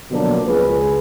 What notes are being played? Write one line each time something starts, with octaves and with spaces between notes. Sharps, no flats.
B2 D3 F3 F#3 A#3 D4
C#2 G#4 B4